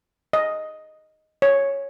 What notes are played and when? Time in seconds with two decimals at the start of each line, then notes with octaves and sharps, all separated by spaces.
0.33 D#5
1.42 C#5